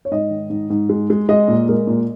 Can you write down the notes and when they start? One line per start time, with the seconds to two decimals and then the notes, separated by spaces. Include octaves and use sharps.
0.05 C#5
0.11 G#2 D#5
0.30 D#3
0.50 G#2
0.70 G#2
0.89 G#3
1.10 G#3
1.29 G#3 D#5
1.48 A#2
1.68 G#3 A#4
1.87 A#2